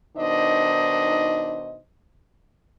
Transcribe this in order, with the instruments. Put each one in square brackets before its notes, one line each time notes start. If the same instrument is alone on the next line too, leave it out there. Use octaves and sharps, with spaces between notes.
[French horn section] B2 D#3 D4 D#4 C5 D#5